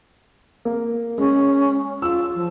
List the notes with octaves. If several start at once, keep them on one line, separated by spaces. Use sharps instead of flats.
A#3
G#3 C#4
F4 E6
F3